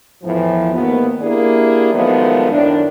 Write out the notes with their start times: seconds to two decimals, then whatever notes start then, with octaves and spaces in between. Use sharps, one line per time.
0.23 E2 A2 E3 F3
0.73 D#2 G#2 D#3 B3
1.21 A#3 D4 E4 G4 G#4 D5
1.93 D#3 F3 F#3 G#3 A3 B3
2.52 F#2 A2 D#3 D4